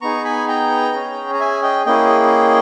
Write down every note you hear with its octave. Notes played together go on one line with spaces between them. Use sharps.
B3 D#4 G#4 A#5 C#6
G#5 B5
G5 A#5
C#4 G#4
A#5
E5 G#5
D#5 G5
A#3 C#4 E4 G#4 D#5 G5